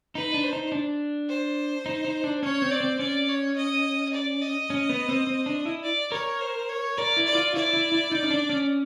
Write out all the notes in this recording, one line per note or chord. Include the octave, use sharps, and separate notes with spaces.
D#4 B4
D4
C5
D#4
D4
C5
D#4
D#4
D4
C#4 C#5
C4
D5
C4
C#4 D5
C#5
D#5
D5
D#5
C#4
B3
C4
C4
D4
E4
D5
A#4 C#5
C5
C#5
A#4 D5
E4
D5
F4
E4 D5
E4
E4
D#4
C#4
D4
C#4